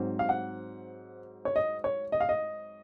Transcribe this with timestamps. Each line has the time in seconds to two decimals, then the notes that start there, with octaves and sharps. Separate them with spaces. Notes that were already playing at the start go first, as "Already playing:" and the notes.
Already playing: G#2 F#3 C4
0.19 F5
0.29 F#5
1.45 C#5
1.56 D#5
1.84 C#5
2.12 D#5
2.20 F5
2.29 D#5